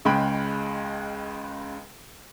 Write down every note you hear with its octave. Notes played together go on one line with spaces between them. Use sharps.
C#2 C#3 G#3 G5 B5